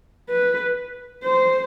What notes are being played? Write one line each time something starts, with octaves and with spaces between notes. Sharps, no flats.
B4
C5